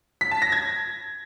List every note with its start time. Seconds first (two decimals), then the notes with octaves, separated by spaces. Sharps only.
0.21 B6
0.31 A5
0.42 A#6
0.52 G#6